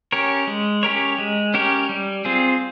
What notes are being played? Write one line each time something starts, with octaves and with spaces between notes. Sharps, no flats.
C#4 G4 A#4 C#5
G#3
C#4 G4 A#4 C#5
G#3
C#4 G4 A#4 C#5
G3
C4 F4 G#4